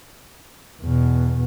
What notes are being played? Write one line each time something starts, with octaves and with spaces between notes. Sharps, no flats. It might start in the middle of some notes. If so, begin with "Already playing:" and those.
E2 B2